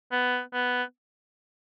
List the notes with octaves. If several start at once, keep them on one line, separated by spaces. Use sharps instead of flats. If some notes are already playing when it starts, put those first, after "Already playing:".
B3
B3